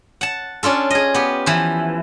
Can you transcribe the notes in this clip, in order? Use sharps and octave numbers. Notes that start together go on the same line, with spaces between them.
F#5 A5
C#4 D4 F4 A4
G#4 D#5
B3 G4
E3 F3